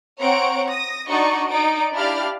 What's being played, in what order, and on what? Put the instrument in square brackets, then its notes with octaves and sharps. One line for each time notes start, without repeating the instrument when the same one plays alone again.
[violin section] C4 C#5 F#5 A#5 C#6 D7
D#6 A#6
D4 D#4 F#4 D5 D#5 C#6
D#4 D5 D7
D4 E4 G4 D5 F5 F6